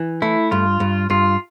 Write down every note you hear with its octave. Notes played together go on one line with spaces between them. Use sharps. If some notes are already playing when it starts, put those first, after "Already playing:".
Already playing: E3
A3 E4
G2 F4
G2
G2 F4